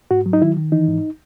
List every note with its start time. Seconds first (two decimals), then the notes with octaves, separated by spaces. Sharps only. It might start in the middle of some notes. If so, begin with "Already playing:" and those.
0.11 G#2 F#4
0.26 F#3
0.33 D#4
0.42 D#3 E4
0.57 D#3
0.72 E3 D#4
0.88 G#2